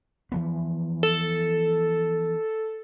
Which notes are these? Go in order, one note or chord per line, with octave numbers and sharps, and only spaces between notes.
E3 F3 B3
A4